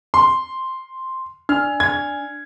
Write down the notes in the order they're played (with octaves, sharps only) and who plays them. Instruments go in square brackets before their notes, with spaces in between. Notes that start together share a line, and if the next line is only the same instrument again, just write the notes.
[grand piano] C6
[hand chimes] D4 [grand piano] F6
[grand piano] G#6